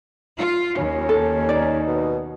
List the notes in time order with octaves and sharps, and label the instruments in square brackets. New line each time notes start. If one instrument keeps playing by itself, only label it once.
[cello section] F4
[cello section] D#2 [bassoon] C#4
[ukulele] A4
[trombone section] D#4 [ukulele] D5
[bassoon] B2